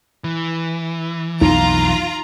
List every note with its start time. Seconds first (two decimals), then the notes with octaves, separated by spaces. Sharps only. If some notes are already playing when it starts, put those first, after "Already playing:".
0.24 E3
1.41 B1 F2 D#4 F4 A#5